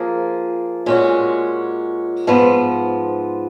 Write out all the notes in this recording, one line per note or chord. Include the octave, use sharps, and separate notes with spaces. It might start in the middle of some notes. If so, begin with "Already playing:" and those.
Already playing: F3 A#3 G#4
A#2 G#3 C#4 F#4
G#2 F3 B3